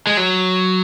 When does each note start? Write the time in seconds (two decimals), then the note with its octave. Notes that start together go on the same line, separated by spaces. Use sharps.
0.07 G#3
0.17 F#3